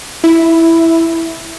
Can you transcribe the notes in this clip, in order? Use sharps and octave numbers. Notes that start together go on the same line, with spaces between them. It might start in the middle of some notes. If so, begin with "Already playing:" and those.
E4